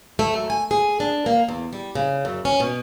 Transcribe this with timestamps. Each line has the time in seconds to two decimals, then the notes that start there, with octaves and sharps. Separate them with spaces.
0.19 A3
0.34 F#2
0.50 G#5
0.71 G#4
1.00 D4
1.26 A#3
1.49 E2
1.73 G3
1.95 C#3
2.25 F#2
2.45 C#4
2.60 B2